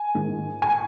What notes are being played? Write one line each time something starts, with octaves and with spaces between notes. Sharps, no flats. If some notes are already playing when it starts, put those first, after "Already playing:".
Already playing: G#5
G#2 D#3
G#5